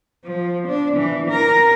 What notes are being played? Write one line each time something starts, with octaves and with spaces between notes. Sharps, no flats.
F3
D4
E3
A#4